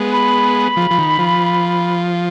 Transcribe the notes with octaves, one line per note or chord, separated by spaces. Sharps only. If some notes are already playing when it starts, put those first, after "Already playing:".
Already playing: G#3 B3
B5
F3
F3
D#3
F3